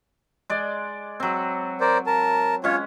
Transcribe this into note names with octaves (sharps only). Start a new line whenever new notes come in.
G#3 D5
F#3 C4
A#4 C5 D5
A#4 A5
G#3 C#4 F4 C#5